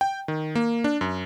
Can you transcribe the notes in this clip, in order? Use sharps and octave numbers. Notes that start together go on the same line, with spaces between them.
G5
D#3
A#3
D4
F#2